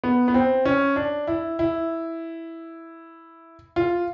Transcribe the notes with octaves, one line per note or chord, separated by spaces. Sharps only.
B3
B3
C4
C#4
D4
E4
E4
F4